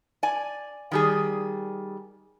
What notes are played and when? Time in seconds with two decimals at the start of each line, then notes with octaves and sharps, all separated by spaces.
0.23 D5 G#5
0.91 D#3 G3 G#4